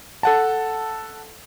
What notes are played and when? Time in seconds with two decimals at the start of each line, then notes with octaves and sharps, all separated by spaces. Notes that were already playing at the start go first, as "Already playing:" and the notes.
0.23 A4 F#5 A5